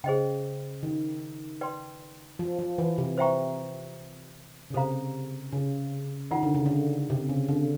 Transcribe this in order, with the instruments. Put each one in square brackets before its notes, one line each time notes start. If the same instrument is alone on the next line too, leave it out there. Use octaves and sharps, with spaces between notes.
[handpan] C#3 [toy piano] G#4 C5 D#5 G5
[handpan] D#3
[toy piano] B4 D5 G5 C6
[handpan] F3
F3
E3
C3
[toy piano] C5 E5 G5 A#5 C#6
[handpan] C#3
[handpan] C3 [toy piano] A4 C5 F5 A#5
[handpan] C#3
[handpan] D#3 [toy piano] F4 A#4 D5 F#5 A#5
[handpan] D3
C#3
D3
C3
C#3
D3